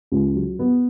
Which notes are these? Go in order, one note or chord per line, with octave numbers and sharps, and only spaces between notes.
C#2
F#3
B3